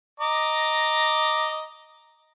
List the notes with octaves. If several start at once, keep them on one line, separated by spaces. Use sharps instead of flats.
D#5 A#5 D6